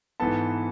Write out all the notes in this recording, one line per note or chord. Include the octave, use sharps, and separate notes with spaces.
G#2 E3 B3 A4 A5